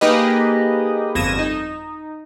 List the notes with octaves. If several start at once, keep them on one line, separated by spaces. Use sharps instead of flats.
A#3 D#4 G4 G#4 B4 D#5
G1 F2 G#6 A#6 D#7 E7
D#4